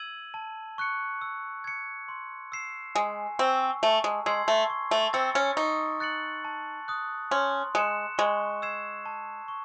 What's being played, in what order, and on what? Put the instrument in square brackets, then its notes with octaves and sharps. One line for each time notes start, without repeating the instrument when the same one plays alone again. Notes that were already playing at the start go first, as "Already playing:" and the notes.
Already playing: [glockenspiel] E6 G#6 D#7 F#7
A5
C#6 F#6 C#7
E6
G#6 C#7
C6
E6 C7 E7
[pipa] G#3 [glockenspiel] G#5
[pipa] C4 [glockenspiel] C#6 E6
[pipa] A3 [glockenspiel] A5
[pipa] G#3
[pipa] G#3 [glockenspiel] C6 E6 G#6 C7
[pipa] A3
[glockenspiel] C#6
[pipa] A3
[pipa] C4 [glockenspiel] E6 A6 C#7
[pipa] C#4
[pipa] D#4 [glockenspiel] C#6
[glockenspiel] F#6 A6 C#7 F#7
A5
D#6 F#6
[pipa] C#4 [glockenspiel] C6
[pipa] G#3 [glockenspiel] F#6 C#7 E7
[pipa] G#3 [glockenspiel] C#6
[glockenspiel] E6 G#6 C7 E7
A5
C#6